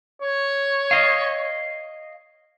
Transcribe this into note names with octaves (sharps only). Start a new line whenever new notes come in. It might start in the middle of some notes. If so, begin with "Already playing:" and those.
C#5
D#5 F5